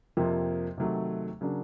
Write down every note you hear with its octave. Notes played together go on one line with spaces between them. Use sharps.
F2 C3 F3 A#3
C3 D#3 F#3 A3
C#3 F#3 A#3 D4